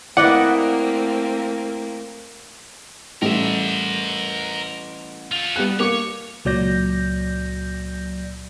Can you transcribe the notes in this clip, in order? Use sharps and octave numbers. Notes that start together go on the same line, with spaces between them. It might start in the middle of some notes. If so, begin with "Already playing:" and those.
A3 A#3 C4 E4 B4 D5 D#5 F#5
A1 G3 A3 A#4 E5
F4 A4
G3 B3 F#6
A#3 C#5 D6
C#2 A#2 F#3 D5 G6 A#6